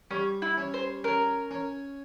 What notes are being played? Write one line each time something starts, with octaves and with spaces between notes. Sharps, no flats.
G3 C#4
E4
C#4
C5
C#4 A#4
C#4